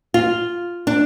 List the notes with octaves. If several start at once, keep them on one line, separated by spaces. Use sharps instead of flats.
F4
D4